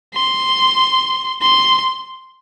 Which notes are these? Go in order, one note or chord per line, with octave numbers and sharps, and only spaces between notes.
C6
C6